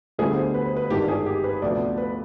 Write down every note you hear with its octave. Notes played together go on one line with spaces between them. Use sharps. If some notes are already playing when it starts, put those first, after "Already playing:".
D2 D3 G3 B3 G#4
C5
B4
C5
B4
G#1 G2 D#3 G#3 G4
G#4
G4
B4
D2 C3 F3 B3 D5
B4